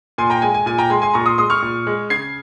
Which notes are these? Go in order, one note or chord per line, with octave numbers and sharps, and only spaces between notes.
A#2 G#5 C6
G5 A#5
G#3 G#5
G#5
A#2 G#5
G5 A#5
G#3 G#5 C6
G#5 C6
A#2 A#5 C#6
C6 D#6
G#3 C6 D#6
C#6 F6
A#2
G#3
C#3 G#6 C7